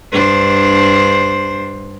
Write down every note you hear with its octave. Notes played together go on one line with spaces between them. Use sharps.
G2 D4 C5